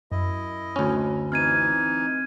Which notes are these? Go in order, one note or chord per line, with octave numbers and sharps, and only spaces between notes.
F#2 E4 D#5
D2 C#4
E3 C4 D#4 F6 G#6 D#7